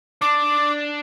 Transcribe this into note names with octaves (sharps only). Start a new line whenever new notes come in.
D4 D6